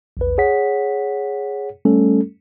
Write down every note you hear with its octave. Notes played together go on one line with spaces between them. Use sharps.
A#1 E2 B4
G#4 C#5 F#5 B6
G3 A3 C#4 A4